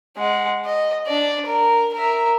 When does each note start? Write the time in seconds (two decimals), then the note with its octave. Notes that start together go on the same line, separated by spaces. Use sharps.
0.17 G#3 F#5
0.65 D#5
1.07 D4 D5
1.46 A#4
1.94 A#4 E5